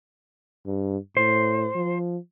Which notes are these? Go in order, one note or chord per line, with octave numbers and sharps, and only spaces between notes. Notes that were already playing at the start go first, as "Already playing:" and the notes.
G2
A2 C5
F3